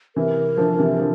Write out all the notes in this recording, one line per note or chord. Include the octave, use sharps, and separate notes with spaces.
C3 E3 A#4
D3 F3
C3 E3
D3 F3